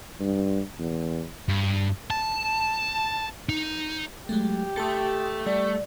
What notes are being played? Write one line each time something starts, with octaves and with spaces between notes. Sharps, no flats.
G2
E2
G2
A5
D#4
F#3 G#3 A3 G4
A3 A4 A5 C6 D#6
G3 A3 D5